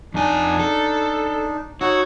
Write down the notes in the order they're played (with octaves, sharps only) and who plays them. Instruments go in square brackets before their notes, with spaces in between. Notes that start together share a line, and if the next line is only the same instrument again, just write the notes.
[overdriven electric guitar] F2 G#5 [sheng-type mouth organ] D4 D#4
[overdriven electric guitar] A4
[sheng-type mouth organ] D#4 C#5 E6 [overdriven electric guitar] F#4